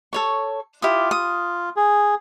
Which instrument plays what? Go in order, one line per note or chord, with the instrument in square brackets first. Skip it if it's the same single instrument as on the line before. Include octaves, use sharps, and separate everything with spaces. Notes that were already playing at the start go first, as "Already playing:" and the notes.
[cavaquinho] A4 C#5 C#6
[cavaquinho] E4 G4 D#6 [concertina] F4
[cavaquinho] D#6
[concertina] G#4